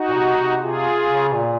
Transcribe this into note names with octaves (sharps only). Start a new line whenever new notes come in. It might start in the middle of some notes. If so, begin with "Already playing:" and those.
Already playing: D#4 F#4
A#2
C3
C3
C3 F4 G#4
C#3
A#2